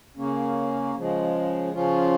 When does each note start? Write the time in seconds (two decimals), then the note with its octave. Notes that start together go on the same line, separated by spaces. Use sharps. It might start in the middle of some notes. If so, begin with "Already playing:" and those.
0.17 C#3 A#3 C#4
0.96 C#3 F3 G#3
1.73 C#3 F3 C#4 F4